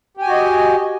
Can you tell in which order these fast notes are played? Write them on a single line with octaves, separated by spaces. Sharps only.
G4 G#5 F#4 D#5